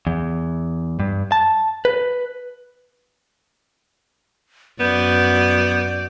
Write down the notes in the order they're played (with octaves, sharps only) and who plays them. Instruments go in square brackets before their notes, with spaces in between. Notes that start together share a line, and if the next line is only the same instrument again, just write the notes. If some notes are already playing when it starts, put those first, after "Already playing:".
[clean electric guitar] E2
G2
A5
B4
[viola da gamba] F#2 D5 [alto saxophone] B3 [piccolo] G6